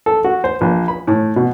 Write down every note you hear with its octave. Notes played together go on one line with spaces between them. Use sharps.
A4
F#4
C5
A#1
B5
A2
B2